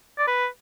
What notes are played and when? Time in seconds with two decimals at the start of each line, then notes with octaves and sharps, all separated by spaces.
0.19 D5
0.27 B4